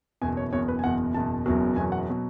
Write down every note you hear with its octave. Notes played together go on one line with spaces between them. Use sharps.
F#1 E2 B2 G#5
C#5
F#1 E2 B2 C#5
B4
G#5
F#1 E2 B2 F#5
F#1 E2 B2 A5
F#1 E2 B2 F#3
F#1 E2 B2 F#3 G#5
F#5
B2 F#3